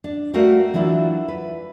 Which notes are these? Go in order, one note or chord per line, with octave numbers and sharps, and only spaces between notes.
D4
G3 A3 F#4 A#4 F5
E3 F#3 D4 E4 F4
B4